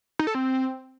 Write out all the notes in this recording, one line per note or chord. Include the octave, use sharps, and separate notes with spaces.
D#4
A4
C4